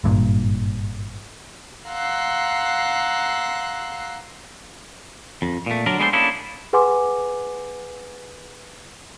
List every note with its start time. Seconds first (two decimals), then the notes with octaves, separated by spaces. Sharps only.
0.04 G#1 G2 A#2
1.87 F5 F#5 A#5 C6 E6 F#6
5.42 F2
5.66 A#2 A3
5.86 D3 F#3 D4 A#4
5.99 G#3 B3 D4 E4 A4 C5
6.13 A#3 C#4 D4 E4 G#4 A4
6.73 G#4 B4 F#5 G#5 C6 D6